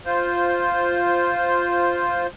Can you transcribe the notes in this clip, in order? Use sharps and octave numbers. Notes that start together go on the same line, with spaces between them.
F4 C5